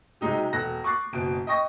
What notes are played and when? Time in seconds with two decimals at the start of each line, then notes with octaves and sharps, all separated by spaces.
0.21 C3 F#3 G#3 D#4 G4
0.53 E1 A4 F#6 A#6
0.84 C#6 D6 F#6 A6 C7
1.13 F#1 B2 D7
1.47 D#5 G5 C#6 A#6